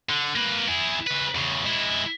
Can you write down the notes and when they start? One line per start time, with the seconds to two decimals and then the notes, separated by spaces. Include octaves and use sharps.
0.10 D3
0.35 A#3 B4
0.68 E4 G#4
1.07 C#3 B4
1.35 E2 C#3
1.65 G#3 E4